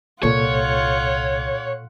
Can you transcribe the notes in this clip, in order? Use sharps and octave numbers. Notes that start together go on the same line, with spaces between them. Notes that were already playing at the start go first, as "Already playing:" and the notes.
C2 A#2 F4 A4 C#5 F#5 C#6